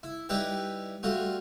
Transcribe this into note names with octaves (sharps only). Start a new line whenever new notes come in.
E4
G3 D#4 E4 G4 B4 G5
G3 A3 F4 F#4